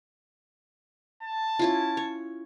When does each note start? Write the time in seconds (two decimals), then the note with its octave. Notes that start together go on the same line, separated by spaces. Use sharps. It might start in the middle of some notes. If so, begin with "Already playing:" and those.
1.23 A5
1.59 C#4 E4 F4
1.97 C#5